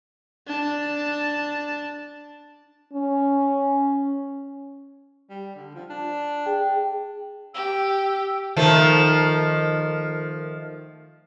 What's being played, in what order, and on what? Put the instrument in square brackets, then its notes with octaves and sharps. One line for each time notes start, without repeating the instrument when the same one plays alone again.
[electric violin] D4 A5
[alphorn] C#4
[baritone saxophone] G3
D3
F3
D4
[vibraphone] G#4 G5
[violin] G4 [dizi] E6
[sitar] D#3 F3 A3